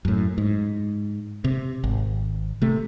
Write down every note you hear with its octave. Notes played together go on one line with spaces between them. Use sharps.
F#2 A2
G#2
C3
G#1
C3 A3